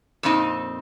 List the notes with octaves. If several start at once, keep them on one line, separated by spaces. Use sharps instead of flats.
F2 A#2 C4 D#4